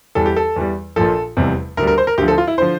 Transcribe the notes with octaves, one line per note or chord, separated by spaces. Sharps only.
E2 E3 G3 A4
G4
A4
E2 E3 G3
A#1 A#2 F3 A4
F1 E2 C3 G3
D2 D3 G3 A#4
A#4
C5
A#4
D2 D3 F3 G4
A4
F4
E4
D3 F3 C5